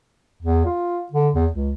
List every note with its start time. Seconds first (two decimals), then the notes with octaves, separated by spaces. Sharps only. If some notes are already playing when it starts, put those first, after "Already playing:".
0.43 E2
0.66 F4
1.12 D3
1.35 E2
1.52 C#2